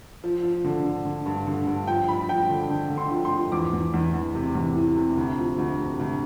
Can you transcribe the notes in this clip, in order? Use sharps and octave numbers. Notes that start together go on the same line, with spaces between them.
F3
F3
D3
D3
D3
G2
D3
G2
F3 G5
F3 B5
F3 G5
D3
D3
D3
C6
F3
C6
F3
E2 D6
E2
E2
E2
C3
E2
E3
C3
D2
F3
D2
C3
D2